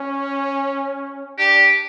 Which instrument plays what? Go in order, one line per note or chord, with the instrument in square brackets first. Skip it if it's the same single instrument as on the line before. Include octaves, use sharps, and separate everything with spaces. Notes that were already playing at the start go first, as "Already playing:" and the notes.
Already playing: [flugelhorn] C#4
[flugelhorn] D4 [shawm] G4